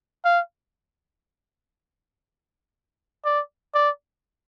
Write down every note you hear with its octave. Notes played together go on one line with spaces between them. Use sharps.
F5
D5
D5